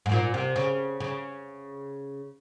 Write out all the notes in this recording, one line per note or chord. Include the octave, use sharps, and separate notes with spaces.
G#2
A#2
C3
C#3
C#3